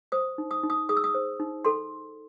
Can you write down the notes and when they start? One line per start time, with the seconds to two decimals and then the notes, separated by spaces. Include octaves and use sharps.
0.12 C5 D#6
0.38 D#4
0.51 D#6
0.63 D#4
0.70 D#6
0.89 G#4 D#6
0.97 E6
1.04 D#6
1.14 C5
1.40 D#4
1.65 A4 C6